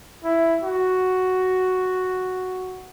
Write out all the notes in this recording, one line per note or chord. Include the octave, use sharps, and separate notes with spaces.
E4
F#4